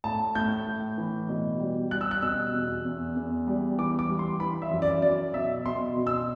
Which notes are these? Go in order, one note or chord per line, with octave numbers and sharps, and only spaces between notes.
A2 A5
A2 G6
A2
E3
B2
G3
G3 F#6
E6
F#6
B2 E6
E2
E2
E2
G3
E3 D6
D6
G3
C6
E3 B5
E5
F#2
D5
F#3 D5
B2 E5
B2 C6
B2
E6